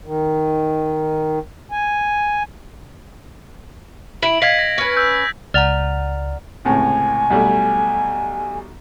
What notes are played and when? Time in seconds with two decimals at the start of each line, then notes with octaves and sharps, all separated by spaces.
0.06 D#3
1.72 G#5
4.23 E4 D7 F#7
4.42 D#5 F5 G#6 B6
4.59 A#6
4.78 C#4 B4
4.97 E6 G6
5.54 C#2 D5 F#5 A#5 F6 A6 F7
6.65 C#2 A2 C3 G#5
7.30 B1 G3 A3